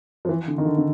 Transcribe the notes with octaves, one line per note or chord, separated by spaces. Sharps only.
F3
E3
D3
D#3
D3
D3